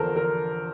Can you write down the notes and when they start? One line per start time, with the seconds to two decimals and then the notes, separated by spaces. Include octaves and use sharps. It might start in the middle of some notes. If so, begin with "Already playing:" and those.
Already playing: E2 D3 F3 A4 A#4 C5
0.16 A#4